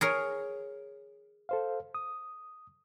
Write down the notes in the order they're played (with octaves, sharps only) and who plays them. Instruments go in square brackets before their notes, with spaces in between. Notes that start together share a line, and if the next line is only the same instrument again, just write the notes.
[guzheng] G#4 A#4 C#5
[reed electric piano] A4 C5 F5
D#6